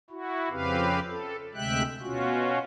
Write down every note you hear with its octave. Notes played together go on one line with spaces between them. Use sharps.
E4 F#4
F2 C#3 C4 G4 B4 F5
A4
D2 C3 G#3 E5 G5 F#6
B2 C#4 F4 F#4